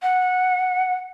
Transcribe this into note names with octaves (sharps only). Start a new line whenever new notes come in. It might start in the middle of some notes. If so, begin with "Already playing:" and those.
F#5